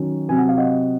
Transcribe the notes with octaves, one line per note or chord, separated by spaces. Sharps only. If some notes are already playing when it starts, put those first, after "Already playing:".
Already playing: D#3 F#3 C#4
C3 F#3 C4 G#5
F#5
F5
D#5 F#5